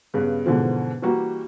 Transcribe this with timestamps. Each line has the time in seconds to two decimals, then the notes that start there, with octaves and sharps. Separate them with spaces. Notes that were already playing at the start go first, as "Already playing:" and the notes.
0.14 G2 C#3 B3
0.46 G#2 B2 D3 E3 F3
1.02 E3 G3 A#3 F#4